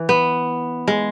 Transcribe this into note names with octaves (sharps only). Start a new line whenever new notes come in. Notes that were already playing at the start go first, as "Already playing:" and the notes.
Already playing: E3
B3
G#3